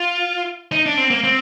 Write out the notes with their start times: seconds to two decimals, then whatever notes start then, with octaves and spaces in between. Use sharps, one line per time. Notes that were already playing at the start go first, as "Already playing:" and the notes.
Already playing: F4
0.72 D#4
0.86 D4
0.97 C4
1.10 A#3
1.24 C4